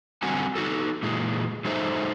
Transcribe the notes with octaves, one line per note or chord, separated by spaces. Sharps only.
D3 G3 C4 F#4 F#5 G#5
D#4 F#4 A4
A#2 E3 G#3
F#3 G#3 D#4 A4 C5 E5